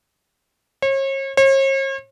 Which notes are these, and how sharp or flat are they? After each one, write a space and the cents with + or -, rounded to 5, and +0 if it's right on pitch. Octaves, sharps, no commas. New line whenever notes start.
C#5 -40
C#5 -45